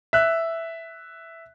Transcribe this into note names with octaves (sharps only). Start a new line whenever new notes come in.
E5 F#6